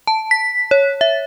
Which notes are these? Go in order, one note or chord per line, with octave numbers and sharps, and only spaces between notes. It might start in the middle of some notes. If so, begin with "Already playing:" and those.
A5
B6
C#5
E5